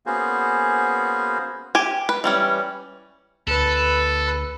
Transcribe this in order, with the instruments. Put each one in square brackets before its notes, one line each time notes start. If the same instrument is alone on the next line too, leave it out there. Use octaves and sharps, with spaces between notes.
[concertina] A#3 B3 C#4 F#4 G#4 C5
[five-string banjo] G4 G#5
B4
E3 G3 C#4
[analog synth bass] D2 [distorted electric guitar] A4 [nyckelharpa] B4